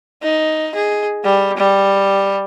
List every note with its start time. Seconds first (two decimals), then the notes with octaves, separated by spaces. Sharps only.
0.23 D#4
0.75 G#4
1.24 G3
1.57 G3